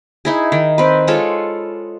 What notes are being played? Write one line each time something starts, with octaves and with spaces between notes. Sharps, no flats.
D#4 E4 G#4
D#3
C4 B4
G#3 F4 A4 C#5